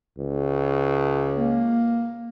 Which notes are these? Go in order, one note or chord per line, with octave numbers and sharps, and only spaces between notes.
C#2
A#3